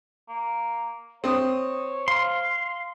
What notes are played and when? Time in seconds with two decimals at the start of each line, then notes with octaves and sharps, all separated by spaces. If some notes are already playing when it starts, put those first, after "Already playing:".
0.28 A#3
1.24 C4 C#5 D#6
2.08 F5 C6